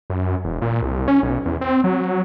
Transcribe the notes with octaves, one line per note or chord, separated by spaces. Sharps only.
F#2
E1
A#2
C2
C#4
B1
E2
C4
F#3